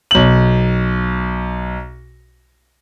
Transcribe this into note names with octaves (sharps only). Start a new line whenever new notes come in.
B1 F#7